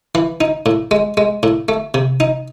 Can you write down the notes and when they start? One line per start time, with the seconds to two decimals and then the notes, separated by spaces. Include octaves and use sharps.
0.15 E3
0.41 D#4
0.66 A2
0.91 G#3
1.17 G#3
1.43 A2
1.68 A3
1.94 C3
2.20 D#4